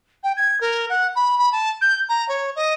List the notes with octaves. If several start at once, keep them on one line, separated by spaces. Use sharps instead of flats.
G5
G#6
A#4
F#5
B5
B5
A5
G6
A#5
C#5
D#5